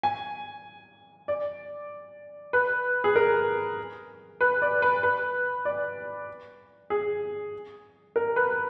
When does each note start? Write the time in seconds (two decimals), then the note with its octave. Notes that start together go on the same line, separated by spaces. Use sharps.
0.03 G#5
1.28 D5
2.53 B4
3.04 G#4
3.16 A#4
4.41 B4
4.62 D5
4.82 B4
5.03 B4
5.65 D5
6.90 G#4
8.16 A#4
8.36 B4